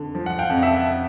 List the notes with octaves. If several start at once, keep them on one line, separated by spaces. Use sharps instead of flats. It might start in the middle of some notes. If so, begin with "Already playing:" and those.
Already playing: F2 D3
F3
F#5
F5 G5
F2
E5 F#5
E5 F#5